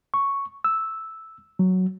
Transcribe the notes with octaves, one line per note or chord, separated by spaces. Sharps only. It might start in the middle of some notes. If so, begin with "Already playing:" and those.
C#6
E6
F#3